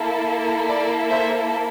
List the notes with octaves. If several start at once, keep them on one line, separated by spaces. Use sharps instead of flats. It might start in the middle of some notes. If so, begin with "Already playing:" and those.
Already playing: A#3 E4 A4
D5
C5 E5